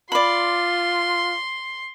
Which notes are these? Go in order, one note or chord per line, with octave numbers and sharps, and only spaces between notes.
F4 D5 B5 C6